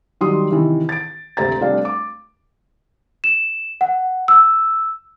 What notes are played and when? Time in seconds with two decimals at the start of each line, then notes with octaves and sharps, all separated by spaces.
0.21 D#3 F#3 G3 C6 D#6
0.51 C3 D#3 E3
0.89 A6 D7
1.37 D2 C3 C5 A#5 A6
1.60 F1 G3 C4 D4 G4 F5
1.85 D6
3.24 E7
3.81 F#5
4.28 E6